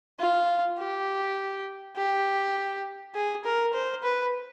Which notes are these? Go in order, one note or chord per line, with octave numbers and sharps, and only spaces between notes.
F4
G4
G4
G#4
A#4
C5
B4